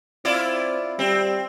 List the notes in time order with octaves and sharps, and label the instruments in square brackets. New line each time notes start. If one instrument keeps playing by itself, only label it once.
[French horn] C4 [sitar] E4 F4 D5
[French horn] G3 [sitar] C4